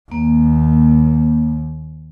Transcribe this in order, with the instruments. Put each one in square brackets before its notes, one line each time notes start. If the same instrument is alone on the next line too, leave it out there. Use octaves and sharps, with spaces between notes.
[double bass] D#2 [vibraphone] A#3